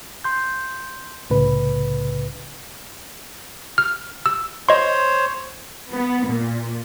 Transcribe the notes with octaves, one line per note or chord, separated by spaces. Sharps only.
C6 G6
C2 A2 C#3 B4
F6
E6
C5 C#5 D#5 C6
B3
A#2